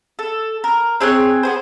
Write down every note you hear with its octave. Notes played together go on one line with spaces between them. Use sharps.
A4
A#4
C4 G#4 C#5 F#6
B3 G#4 C5